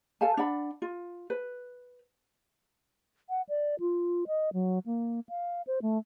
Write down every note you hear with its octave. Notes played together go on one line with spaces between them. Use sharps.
A4 F5 G#5 A5
D4 D5 F#5 B5
F4
B4
F#5
D5
F4
D#5
F#3
A#3
F5
C5
A3